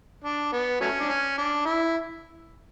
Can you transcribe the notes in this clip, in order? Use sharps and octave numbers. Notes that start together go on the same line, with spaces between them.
D4
B3
F#3 A3 C#4
D4
C#4
D4
E4